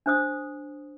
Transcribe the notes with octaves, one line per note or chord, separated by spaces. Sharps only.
D4 C5 D#6